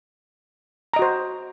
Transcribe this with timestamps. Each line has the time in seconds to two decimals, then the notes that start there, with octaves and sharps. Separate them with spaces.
0.93 A#5
0.96 D#5
0.99 F#4
1.02 C5